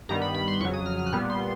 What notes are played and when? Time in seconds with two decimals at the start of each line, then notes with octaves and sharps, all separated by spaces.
0.09 G2 D#3 G3 B3 A#5
0.22 B5
0.35 B5
0.48 C6
0.60 F2 C#3 F#3 C#6
0.74 D#6
0.86 F6
0.99 F6
1.06 F#6
1.12 A#2 G3 B3 F6
1.30 C6